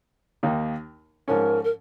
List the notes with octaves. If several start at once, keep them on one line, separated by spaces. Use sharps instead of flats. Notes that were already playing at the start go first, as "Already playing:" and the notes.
D#2 D#3 A#3 D#4
G#2 F3 C#4 A#4
A#4